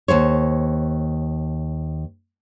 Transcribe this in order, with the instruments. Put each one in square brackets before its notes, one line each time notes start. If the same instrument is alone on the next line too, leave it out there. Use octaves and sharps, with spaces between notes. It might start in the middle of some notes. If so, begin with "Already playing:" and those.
[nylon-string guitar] D#2 G#2 C5 C#5